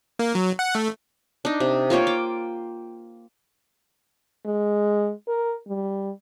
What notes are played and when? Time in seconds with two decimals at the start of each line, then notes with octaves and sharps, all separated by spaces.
0.19 A#3
0.35 F#3
0.59 F#5
0.75 A3
1.45 D4 D#4
1.60 C3
1.90 A#3 F4 C#5 G5
2.07 G5 D6
4.46 G#3
5.28 A#4
5.68 G3